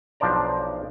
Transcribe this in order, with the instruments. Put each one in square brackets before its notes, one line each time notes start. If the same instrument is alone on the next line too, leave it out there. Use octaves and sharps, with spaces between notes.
[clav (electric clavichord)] B1 F3 D4 C5 D5 A#5